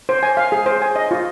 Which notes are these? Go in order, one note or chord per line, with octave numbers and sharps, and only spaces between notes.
C5
G#5
F5
G#4
C5
G#5
D#5
F4